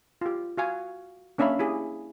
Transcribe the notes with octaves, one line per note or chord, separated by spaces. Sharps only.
F4 G4
F#4 F5 G#5
A#3 C#4 D4 E5 F5 B5
E4 G4 G#4